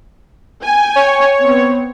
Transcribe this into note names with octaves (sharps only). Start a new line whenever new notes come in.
G5 G#5
C#5
B3 C4